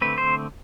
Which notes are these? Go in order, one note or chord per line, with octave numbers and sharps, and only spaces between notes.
D3 A3 C4 B4
C5